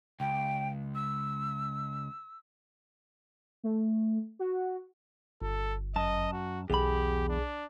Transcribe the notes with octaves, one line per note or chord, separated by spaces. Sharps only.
C#2 G5
E6
A3
F#4
G1 A4
F#2 D#5 A5
F#4
B1 E2 G4 G#4 B5
D4